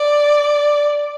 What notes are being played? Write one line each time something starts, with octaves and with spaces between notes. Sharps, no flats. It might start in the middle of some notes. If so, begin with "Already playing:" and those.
Already playing: D5